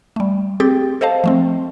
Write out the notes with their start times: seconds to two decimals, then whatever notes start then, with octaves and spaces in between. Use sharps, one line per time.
0.16 G3 A3
0.60 C4 G4 G#4 G5 A6
1.01 A4 C5 D#5 F5 A5
1.24 F3 A3 C4